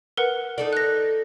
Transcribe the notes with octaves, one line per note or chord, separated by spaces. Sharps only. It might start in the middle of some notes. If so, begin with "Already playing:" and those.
A#4 B4 F#5
D#4 A4 D5
F#6 A#6